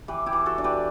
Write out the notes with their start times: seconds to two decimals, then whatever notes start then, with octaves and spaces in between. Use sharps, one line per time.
0.08 E3 G4 B4
0.26 E4 G4
0.33 E3
0.46 F#4 A4
0.58 D4
0.64 G4 B4